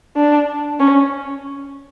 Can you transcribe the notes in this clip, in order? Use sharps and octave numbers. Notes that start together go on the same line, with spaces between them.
D4
C#4